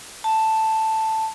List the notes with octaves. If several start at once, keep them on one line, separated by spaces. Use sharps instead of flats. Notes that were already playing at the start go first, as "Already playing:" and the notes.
A5